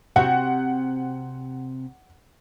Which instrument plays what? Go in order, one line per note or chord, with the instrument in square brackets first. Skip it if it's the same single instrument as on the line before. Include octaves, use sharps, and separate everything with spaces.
[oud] C3 C4 F#4 [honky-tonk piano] F#5